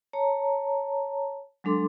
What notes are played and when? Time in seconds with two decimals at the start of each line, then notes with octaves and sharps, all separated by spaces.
0.13 C#5 A5 A#5
1.64 F#3 G#3 D4 A4 C6 D6